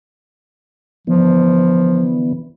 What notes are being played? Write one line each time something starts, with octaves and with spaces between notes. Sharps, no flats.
D3 E3 F3 B3